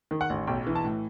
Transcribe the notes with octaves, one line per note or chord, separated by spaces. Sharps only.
D#3
F#5
A1
B1 G5
E3
A5
A2